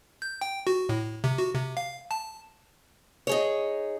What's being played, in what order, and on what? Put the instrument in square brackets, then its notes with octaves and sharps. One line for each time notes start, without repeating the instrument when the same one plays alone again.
[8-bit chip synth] G6
G5
F#4
A2
C3
F#4
C3
F5
A5
[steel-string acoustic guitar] D#4 G#4 C#5